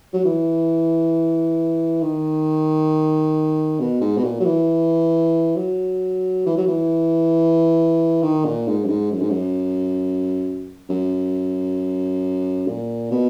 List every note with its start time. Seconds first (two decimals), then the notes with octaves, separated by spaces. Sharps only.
0.13 F#3
0.25 E3
2.02 D#3
3.80 B2
4.01 G#2
4.17 B2
4.24 A#2
4.40 F#3
4.45 E3
5.56 F#3
6.46 E3
6.57 F#3
6.67 E3
8.22 D#3
8.45 A#2
8.67 G#2
8.84 F#2
8.89 G#2
9.12 F#2
9.21 G#2
9.30 F#2
10.89 F#2
12.67 A#2
13.11 B2